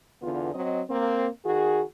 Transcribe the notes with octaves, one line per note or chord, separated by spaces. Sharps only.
E2 D3 B3 F4
F#3 C4 D#5
A#3 C4
D#3 F#4 G#4